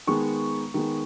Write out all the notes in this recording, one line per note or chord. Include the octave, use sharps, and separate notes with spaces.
D#3 G#3 B3 C#6
D#3 G#3 B3